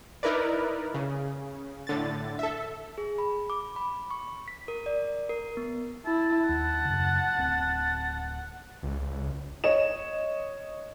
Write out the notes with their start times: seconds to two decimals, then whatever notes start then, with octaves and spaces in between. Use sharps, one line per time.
0.23 D#4 E4 A#4 B4 D5
0.94 C#3
1.87 A2 D3 A6
2.39 A4 E5
2.98 G#4
3.18 B5
3.50 D6
3.76 B5
4.11 C#6
4.48 B6
4.68 A#4
4.86 D5
5.29 A#4
5.57 B3
6.06 E4 A5
6.49 D#2 F#5
6.85 F#2 C#3
7.38 D1 C4
8.83 C#2
9.64 C#5 D#5 E7